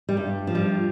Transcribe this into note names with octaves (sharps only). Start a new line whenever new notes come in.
G3
G2
F3
G3